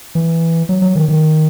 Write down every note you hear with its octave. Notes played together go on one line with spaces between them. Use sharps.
E3
F#3
F#3
D#3
D#3